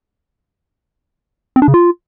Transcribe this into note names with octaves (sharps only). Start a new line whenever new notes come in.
C4
D4
C#3
F4